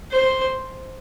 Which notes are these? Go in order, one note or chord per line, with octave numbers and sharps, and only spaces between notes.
C5